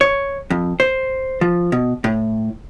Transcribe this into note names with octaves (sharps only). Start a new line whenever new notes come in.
C#5
F2
C5
F3
B2
A2